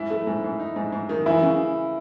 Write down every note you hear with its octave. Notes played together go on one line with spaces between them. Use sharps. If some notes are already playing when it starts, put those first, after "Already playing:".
Already playing: G#2 E4
A3
G#2
G#2
D#4
G#2
G#2
D#3
E3 E4
C#3